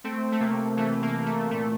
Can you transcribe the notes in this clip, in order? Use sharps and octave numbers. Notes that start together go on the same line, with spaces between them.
A3 C4
A3
C3 A#3
E3 A3
A#3
E3
A3
A#2 A3